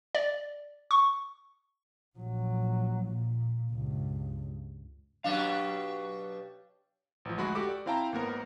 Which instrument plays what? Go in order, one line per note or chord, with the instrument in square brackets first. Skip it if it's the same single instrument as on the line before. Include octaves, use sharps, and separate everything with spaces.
[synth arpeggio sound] D5
C#6
[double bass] A#1 F#3
A#2
C#2 G2
[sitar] B2 F#3 D4 [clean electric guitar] G4 F5
[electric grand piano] A1 F3
D2 G#3 F#4 G#4 B5
F#4 G4 A4 D6
D5
C4 E4 F5 G5 A5 A#5
G#1 A#3 B3 A#4